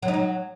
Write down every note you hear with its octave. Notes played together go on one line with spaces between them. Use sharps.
F#3
D#4
F#3